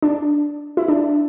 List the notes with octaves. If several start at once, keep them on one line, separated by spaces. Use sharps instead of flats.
D4
E4
D4